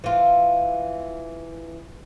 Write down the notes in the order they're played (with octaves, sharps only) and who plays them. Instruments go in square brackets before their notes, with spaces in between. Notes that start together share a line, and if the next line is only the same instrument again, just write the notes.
[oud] E3 F4